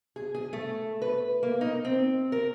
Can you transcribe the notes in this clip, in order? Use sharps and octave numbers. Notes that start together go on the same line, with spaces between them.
G#4
G#4
A3
B4
A#3
D#4
C4
A#4